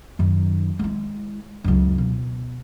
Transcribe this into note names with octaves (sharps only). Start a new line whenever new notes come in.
F#2 D#3
G#3 E4
C#2 F#2
B2